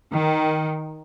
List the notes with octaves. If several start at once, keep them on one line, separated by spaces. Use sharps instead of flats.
D#3